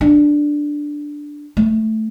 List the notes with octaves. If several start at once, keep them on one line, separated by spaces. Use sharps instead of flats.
D4
A3